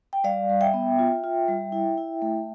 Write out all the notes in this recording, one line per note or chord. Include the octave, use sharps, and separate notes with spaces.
G5
G3 D5 F5
G3
E5 G5
B3
F4
F4
G3
E4
E4
A3